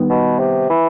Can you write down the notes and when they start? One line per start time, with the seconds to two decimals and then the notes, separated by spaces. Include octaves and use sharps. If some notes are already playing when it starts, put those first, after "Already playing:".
Already playing: D#3 G3 B3
0.10 B2
0.39 C3
0.69 E3